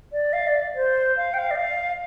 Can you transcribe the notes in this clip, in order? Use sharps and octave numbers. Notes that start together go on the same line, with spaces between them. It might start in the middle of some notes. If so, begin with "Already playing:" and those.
D5
F5
D5
C5
F5
G5
F5
D5
F5